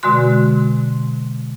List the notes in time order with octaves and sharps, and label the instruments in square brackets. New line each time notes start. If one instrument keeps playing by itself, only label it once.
[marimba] B2 D3 G#3 F#4 C6